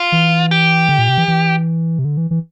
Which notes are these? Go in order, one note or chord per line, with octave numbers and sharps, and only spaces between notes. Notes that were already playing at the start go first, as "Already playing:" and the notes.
Already playing: F4
E3
G4
D3
A#2
C3
E3
E3
C3
D3
E3
E3